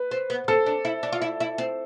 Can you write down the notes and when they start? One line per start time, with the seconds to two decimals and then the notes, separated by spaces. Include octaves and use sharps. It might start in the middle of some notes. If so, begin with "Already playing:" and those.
Already playing: B4
0.11 C4
0.30 B3
0.48 C4 A4
0.66 D4
0.85 E4
1.03 D4
1.12 F4
1.22 E4
1.40 E4
1.58 C4